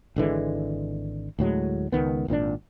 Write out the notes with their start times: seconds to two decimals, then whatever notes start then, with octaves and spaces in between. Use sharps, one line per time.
0.16 G#1 D3 E3 G#3
1.39 D2 A2 F#3 G#3
1.92 C#2 G2 D#3 B3
2.28 G#1 A#2 C4 D4